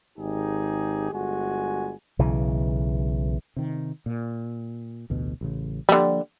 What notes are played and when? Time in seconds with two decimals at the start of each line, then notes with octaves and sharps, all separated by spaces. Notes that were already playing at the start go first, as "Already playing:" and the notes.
0.19 G#1 D#4 G4 G#4
1.11 G1 G#3 F#4 G#5
2.19 B1 C#3 E3
3.56 C3 D#3
4.06 A#2
5.10 A1 D2 B2
5.41 A1 C#3
5.89 D3 F3 G3 A#3